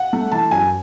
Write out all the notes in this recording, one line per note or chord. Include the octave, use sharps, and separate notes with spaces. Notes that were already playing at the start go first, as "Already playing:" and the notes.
Already playing: F#5
A3
E3 A5
F#2 G#5